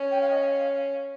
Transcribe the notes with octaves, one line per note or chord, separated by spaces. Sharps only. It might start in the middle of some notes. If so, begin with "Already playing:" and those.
Already playing: C#4
G5
F5
D#5
F5